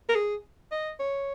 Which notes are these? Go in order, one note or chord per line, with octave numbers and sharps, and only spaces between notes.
A#4
G#4
D#5
C#5